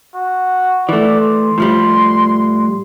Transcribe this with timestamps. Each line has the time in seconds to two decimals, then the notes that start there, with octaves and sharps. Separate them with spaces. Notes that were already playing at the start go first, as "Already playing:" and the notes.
0.14 F#4
0.89 E3 A3 D5
1.20 C6
1.58 A2 F3 G3